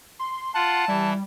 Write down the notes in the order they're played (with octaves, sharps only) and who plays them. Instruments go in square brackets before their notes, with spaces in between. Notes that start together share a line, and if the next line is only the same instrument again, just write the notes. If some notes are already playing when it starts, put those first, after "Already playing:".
[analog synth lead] C6
[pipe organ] F4 F#5 [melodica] A5
[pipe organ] E3 E4 [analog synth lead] G3